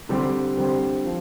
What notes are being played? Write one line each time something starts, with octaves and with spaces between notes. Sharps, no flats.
D3 G3 C4 G4 C5
D3 G3 C4 G4 C5
F3